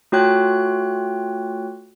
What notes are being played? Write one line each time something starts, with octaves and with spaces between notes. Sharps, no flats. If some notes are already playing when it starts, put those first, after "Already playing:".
A3 F4 F#4 C#5 G5 F#6